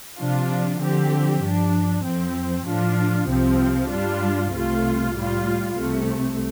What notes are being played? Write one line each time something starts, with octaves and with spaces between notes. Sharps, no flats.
C3 F3 D4 F4
D3 F3 C4 G4
G2 F3 D4
F2 F3 C4
A2 F3 D4 F4
C2 C3 F3 C4
G2 G3 D4 F4
C2 C3 A3 F4
A2 G3 F4
C2 C3 A3